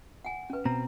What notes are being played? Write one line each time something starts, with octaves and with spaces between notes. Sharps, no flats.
F#5 G#5
C#4 B4
B2 C4 A#5